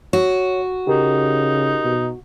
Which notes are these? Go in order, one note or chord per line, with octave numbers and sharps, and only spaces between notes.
F#4 C#5
C#3 D#4 G4 A#4
B2